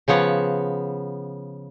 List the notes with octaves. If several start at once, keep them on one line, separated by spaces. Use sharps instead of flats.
C#3 F3 B3 C#5